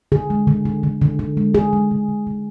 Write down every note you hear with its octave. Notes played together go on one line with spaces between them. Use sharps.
D3 G#4
G#3
D3
D3
D3
D3
D3
G#3
D3 G#4
G#3
D3
D3
D3